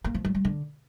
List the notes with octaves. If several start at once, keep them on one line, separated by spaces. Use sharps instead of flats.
A#3
F3
F#3
G3
D3